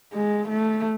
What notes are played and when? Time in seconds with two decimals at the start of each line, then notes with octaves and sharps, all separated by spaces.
0.14 G#3
0.49 A3